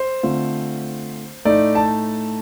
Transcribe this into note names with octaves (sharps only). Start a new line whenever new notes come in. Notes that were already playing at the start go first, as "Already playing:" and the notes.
Already playing: C5
D3 A3 C4 F4
A2 A3 D#4 D5
A5